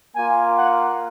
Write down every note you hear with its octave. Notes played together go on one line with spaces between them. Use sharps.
A#3 F4 G#5
F#5